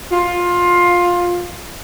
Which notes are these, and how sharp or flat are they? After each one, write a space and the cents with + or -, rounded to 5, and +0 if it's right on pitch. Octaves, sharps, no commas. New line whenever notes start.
F4 +15